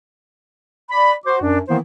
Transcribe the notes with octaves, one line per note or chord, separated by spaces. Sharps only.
D5 B5
F#4 C5 D6
F#2 D4
D#3 E3 A#3 B3 E4 C5